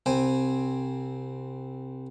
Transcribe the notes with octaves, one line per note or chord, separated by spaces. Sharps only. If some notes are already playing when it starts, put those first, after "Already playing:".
C2 C4 G5 G#5